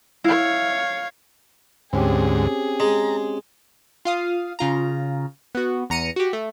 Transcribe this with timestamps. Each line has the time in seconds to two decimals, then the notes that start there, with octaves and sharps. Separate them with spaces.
0.24 E4 C#5 F5
1.93 D2 G#2 C4 C#4 G4 G#4
2.80 G#3 A#5
4.05 F4 F5 D#6
4.59 C#3 F4 A#5
5.55 B3 F#4
5.90 E2 A#5 C#7 D#7
6.16 F#4 G4
6.33 A3